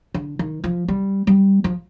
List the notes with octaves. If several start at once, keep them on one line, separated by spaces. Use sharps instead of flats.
D3
D#3
F3
G3
G3
F3